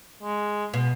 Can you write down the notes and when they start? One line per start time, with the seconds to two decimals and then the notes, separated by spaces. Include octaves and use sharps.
0.23 G#3
0.74 B2